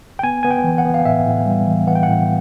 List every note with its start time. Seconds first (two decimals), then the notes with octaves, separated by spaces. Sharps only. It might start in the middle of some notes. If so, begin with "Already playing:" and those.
0.19 G5
0.23 B3 G#5
0.43 B3 G#5
0.51 G5
0.64 E3
0.78 F#5
0.85 B3
0.94 F5
1.05 A2 E5
1.26 A2
1.46 G3
1.67 E3
1.87 E3 F#5
1.95 G5
2.03 F#5
2.08 A2